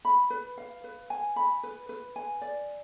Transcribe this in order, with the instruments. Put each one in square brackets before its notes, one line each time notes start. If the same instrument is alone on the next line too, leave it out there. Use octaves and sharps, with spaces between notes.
[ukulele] B5
B4
F5
B4
G#5
B5
B4
B4
G#5
D5